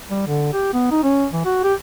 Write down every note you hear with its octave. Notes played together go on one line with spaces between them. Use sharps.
G3
D3
G4
B3
D#4
C#4
E3
F#4
G4